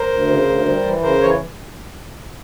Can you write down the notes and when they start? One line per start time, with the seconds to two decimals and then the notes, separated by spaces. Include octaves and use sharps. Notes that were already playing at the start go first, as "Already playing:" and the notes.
Already playing: A#4 C5
0.10 D2
0.28 C#3
0.46 D2
0.65 G3
0.84 E3
1.02 C#3 A#4 C5
1.21 E3 C#5